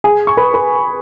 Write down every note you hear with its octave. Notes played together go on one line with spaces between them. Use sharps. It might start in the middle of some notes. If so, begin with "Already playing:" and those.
G#4 G#5
C#6
B4 B5
B4 B5